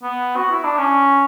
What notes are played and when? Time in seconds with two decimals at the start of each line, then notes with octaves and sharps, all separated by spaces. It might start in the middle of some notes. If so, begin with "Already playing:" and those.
0.03 B3
0.36 F#4
0.51 E4
0.64 D4
0.78 C#4